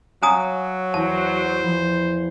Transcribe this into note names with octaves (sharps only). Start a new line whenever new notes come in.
F#3 C#5 D#5 F5 G#5 A#5 D#6
E2 C5 A5 A#6
E2 F3 B5